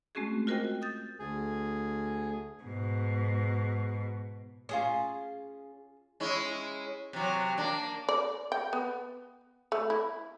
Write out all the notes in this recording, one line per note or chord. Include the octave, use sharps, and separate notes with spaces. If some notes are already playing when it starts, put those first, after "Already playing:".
G#3 A3 C4 C#4 F#4 G#4
F4 F#4 A#4 C5 D#5 G5
D#6 G6 A6
D2 G#4
G#2 B2
C#4 F4 G#4 D#6
G#3 C#4 E4
C3 F#3
A#3 D4
D5
G5
B3
A3
E4